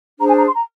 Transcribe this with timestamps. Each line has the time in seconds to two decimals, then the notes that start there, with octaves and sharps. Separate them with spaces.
0.19 D4 G#4 C5 A#5
0.28 G#5
0.37 A#5
0.46 C6
0.55 A#5